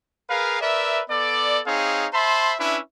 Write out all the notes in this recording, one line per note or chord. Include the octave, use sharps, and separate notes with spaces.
G#4 A#4 B4 F5
A#4 B4 D5 E5
B3 A4 D5
C4 D#4 G#4 C#5 F5
C5 E5 A5 B5 C6
C#4 D4 E4 B4 E5